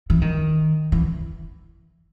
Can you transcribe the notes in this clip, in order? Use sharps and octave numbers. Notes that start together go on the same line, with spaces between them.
E3
D#3
E3